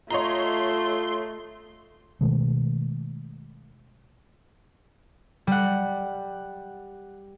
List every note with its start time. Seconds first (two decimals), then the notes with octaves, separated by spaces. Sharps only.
0.10 A3 F4 C#5 D#5 A#5 C6
2.21 B2 D#3 G#3 A3
5.47 G3 F#5